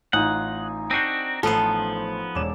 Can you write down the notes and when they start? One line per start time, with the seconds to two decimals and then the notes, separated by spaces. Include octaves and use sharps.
0.13 A1 D#4 F4 F#5 G#5
0.91 C4 D4 F#4 G6 C7 D#7
1.43 A1 F3 B3 A4 C5
2.35 E1 C#5 D5 E7